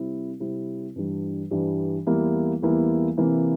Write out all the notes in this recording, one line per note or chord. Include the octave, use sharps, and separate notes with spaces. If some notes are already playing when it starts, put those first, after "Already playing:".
Already playing: C3 G3 C4 E4
C3 G3 C4 E4
G2 E3 G3 D4
G2 E3 G3 D4
E2 E3 G3 A#3 E4
E2 E3 G3 A#3 E4
C3 E3 A#3 E4